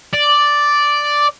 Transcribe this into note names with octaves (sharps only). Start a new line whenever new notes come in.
D5